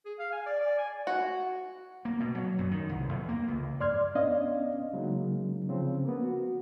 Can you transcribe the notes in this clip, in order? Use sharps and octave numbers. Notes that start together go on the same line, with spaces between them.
G#4
F5
G#5
D5
D5
G#5
F#4
A#3
B2
F#3
F#2
D#3
C2
E2
A#3
C#2
F2 G#2 D5 C6 F6 G#6
B3 C#4 D4 D5 D#5 F5
C#3 F#3 G#3 A#3 D#4
C#3 F3 C4
A#3 B3
F#4